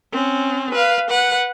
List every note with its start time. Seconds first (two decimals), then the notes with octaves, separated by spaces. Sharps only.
0.12 C4 C#4
0.72 B4 F5
1.10 B4 F#5